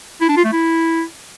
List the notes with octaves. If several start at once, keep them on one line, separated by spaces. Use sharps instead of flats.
E4
D4
F4
A3
E4